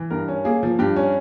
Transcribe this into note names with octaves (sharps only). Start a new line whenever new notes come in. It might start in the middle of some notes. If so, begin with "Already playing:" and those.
Already playing: E3
G2 A#4
C#4
A#3 G#4
F3
G2 G4
C#4